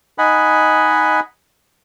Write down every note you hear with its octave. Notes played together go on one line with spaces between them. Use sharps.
D#4 D#5 F#5 G#5 B5